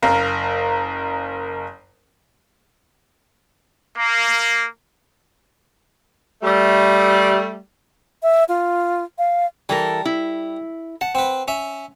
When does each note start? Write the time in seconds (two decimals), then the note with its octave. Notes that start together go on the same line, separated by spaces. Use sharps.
0.02 F#1 A#4 F5 A#5
3.98 A#3
6.42 G3 A3
8.22 E5
8.49 F4
9.18 F5
9.69 E3 G3 A4 A#4
10.05 E4
11.01 F#5 A5
11.15 C4 B4
11.48 C#4 E5